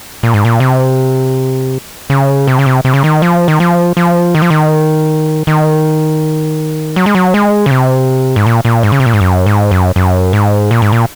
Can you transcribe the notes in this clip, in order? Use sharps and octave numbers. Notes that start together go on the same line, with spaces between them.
A#2
G#2
A#2
C3
C#3
C3
C#3
C3
C3
C#3
D#3
F3
D#3
F3
F3
D#3
F3
D#3
D#3
F#3
G#3
F#3
G#3
C#3
C3
G#2
A#2
A#2
G#2
C#3
C3
A#2
G#2
F#2
G#2
F#2
F#2
G#2
A#2
G#2
A#2